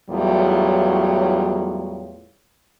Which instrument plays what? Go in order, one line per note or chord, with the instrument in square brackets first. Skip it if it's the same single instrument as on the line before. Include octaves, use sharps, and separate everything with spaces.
[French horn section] E2 A2 F#3 G3 F4 C#5